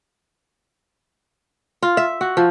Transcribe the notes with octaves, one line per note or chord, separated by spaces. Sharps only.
F4
E5
F#4
F3